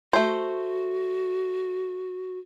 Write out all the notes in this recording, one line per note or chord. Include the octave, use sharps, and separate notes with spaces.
A3 F#4 C5